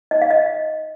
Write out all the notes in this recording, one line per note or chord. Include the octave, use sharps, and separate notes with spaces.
D#4 D#5
F5
D#5